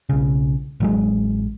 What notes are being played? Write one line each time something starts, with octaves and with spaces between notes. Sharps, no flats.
B1 C#3
A1 F#3 G#3